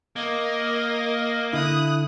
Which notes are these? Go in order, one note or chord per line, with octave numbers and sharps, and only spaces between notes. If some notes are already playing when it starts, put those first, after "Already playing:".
A#3 D#5
D3 E4 D#6 F#6